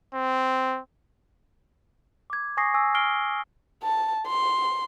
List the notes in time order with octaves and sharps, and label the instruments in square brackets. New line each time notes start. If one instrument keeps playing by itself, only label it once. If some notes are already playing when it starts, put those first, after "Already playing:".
[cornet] C4
[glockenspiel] D6 G#6
G#5 C#6 D#6 A#6 C7
G#5 C#6 E6
F6 C7 D7 G7
[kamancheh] A5
C6